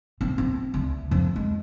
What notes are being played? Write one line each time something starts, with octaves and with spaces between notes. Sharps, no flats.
C4
C4
D2
F2
G#3